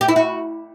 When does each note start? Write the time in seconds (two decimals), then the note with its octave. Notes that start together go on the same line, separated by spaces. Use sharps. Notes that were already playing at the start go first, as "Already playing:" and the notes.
0.01 G4
0.08 E4
0.16 F#4